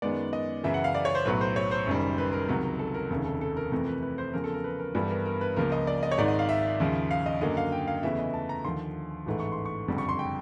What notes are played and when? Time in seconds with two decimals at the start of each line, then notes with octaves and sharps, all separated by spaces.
0.02 F#2 D#3 G#3 B3 D5
0.33 D#5
0.64 F#2 C#3 E3 E5
0.74 F#5
0.84 F5
0.95 D5
1.05 C#5
1.15 C5
1.25 B1 A2 F#3 B4
1.41 C5
1.56 C#5
1.71 C5
1.87 F#1 F#2 D#3 G3
2.18 B4
2.33 A#4
2.49 C#2 C3 D#3 F#3
2.79 A4
2.94 A#4
3.10 F1 D#2 C#3
3.25 A4
3.41 A4
3.57 A#4
3.72 F2 C3 E3 A3 A#4
3.87 B4
4.02 B4
4.18 C5
4.33 E2 C#3 F3 A#4
4.44 A4
4.54 A#4
4.64 B4
4.79 A#4
4.95 G2 E3 G3 B3 A4
5.10 A#4
5.26 A#4
5.41 B4
5.56 C#2 C#3 F3 A#3 A#4
5.72 D#5
5.87 D5
6.03 D#5
6.12 C#5
6.18 G#1 G#2 D#3 D5
6.28 D#5
6.39 F5
6.49 E5
6.80 D#2 C#3 F3
7.11 F5
7.26 D#5
7.41 F#2 D3 F#3 A#3 D#5
7.57 F5
7.72 G5
7.88 F5
8.03 E2 C#3 E3 A3 E5
8.19 D#5
8.34 A5
8.49 A#5
8.65 D#2 D3 F3 C6
9.26 A1 G#2 E3 A3
9.40 C#6
9.52 C6
9.65 C#6
9.88 F#1 F2 D3 G3
9.98 C#6
10.09 C6
10.19 G5